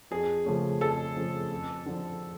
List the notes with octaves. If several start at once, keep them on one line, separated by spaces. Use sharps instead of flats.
F2 G#4
C#3 F3 A3 C#4
F2 A4
C#3 F3 A3 C#4
F2
D3 F3